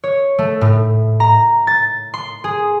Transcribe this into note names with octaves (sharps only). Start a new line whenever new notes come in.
C#5
A3
A2
A#5
A6
C6
G#4